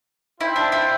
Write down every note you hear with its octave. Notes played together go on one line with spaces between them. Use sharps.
E4 F4 C5 E5 G5
D4
E4